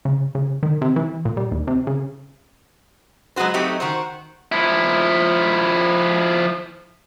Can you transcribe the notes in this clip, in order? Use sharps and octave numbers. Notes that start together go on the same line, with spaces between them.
C#3
C#3
D#3
C3
E3
A#2
G3
D#2
C3
C#3
F#3 G#3 B3 F#4 C5
F#3 A3 C4 D#4 G4
D#3 F#4 C5
F3 E4